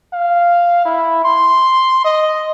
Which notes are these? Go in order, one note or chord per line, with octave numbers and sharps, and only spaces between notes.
F5
E4
C6
D#5